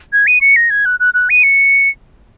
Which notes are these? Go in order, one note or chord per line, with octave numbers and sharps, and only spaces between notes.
G#6
D#7
C#7
A#6
G#6
F#6
F#6
F#6
D#7
C#7